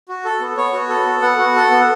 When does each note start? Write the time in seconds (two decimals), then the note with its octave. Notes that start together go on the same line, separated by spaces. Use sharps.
0.08 F#4
0.25 A4
0.40 B3
0.57 B3 C#5
0.73 F#4
0.89 A4
1.06 B3
1.22 B3 F#5
1.39 F#4
1.56 A4
1.71 B3